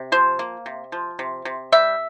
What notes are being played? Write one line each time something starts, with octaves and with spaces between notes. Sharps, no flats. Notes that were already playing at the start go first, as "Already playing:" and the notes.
Already playing: C3
F3 C5
A#3
C3
F3
C3
C3
G3 E5